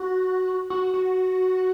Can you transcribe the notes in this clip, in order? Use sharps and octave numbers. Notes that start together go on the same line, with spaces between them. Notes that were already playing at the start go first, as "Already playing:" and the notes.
Already playing: F#4
F#4
F#4